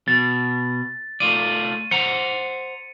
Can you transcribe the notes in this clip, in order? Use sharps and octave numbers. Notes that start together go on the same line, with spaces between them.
B2 A6
A3 F4 D5 D#7
C5 F#5 A#5 C#7